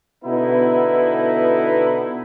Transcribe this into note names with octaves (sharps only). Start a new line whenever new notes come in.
B2 D3 B3 D#4 E4